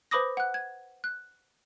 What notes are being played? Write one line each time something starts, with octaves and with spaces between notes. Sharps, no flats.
B4 C5 B5 D6 D#6 A#6
F#5 F#6
G#6
F#6